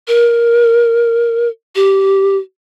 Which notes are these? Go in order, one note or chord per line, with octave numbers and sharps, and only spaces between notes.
A#4
G4